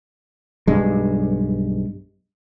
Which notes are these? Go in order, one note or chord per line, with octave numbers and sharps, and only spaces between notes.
B1 G2 G#3